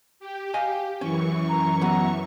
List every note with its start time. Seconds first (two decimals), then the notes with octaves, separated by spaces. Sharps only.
0.20 G4
0.54 D#5 F5 G#5
1.01 F#2 E3 C#4 C#6
1.49 A#5
1.81 F#3 B3 A#5